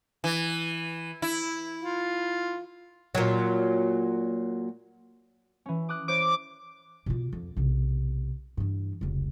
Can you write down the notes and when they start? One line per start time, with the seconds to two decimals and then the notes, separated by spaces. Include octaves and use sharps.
0.24 E3
1.22 E4
1.83 F4
3.15 A#2 F#3
5.66 E3 C#4
5.89 D6 D#6 F#6
6.08 E4 C5 C#5 D6
7.06 B2 F4
7.33 F2
7.57 B1 C3
8.57 G2 E3
9.01 F1 C#2